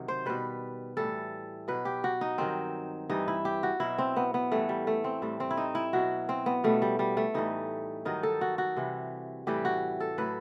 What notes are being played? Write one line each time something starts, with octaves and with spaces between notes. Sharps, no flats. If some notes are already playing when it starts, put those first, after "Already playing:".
Already playing: C3 D#3 F#3
C5
B2 G3 B4
A2 E3 G3 A4
B2 F#3 B4
G4
F#4
D#4
G2 D#3 F#3 C4
G2 E3 G3 D#4
E4
G4
F#4
B2 F#3 E4
C4
B3
B3
A2 E3 G3 A3
G3
A3
C4
A2 G3
C4
E4
D#4
E4
B2 F#3 F#4
C4
B3
B2 G3 A3
G3
G3
A3
A2 E3 G3 D#4
G2 D#3 F#3 D#4
A4
F#4
F#4
C3 E3 G3
A2 E3 G3 G4
F#4
A4
A2 F#3 B4